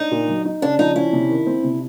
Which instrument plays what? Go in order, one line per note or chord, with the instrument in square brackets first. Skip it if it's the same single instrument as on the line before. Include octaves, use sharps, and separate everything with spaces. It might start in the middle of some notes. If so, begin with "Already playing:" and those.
Already playing: [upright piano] D4 [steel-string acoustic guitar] D#4
[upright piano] A#2
F#3
D#4
[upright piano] C#3 [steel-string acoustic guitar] D4
[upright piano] F3 [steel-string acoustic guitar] D#4
[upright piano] C#4 [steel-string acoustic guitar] E4
[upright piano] C3
D#3
C4
C3